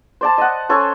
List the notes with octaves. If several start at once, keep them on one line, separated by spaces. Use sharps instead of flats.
C5 D5 A5
D#5 F#5
C#4 A4 C5